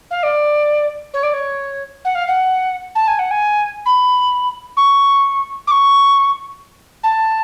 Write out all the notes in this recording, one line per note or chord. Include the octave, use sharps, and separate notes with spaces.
F5
D5
C#5
D5
C#5
F#5
F5
F#5
A5
G#5
F#5
G#5
B5
C#6
D6
C#6
A5